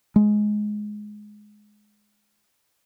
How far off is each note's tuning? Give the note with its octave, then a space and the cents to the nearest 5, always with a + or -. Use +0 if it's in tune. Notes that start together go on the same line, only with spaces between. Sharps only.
G#3 +15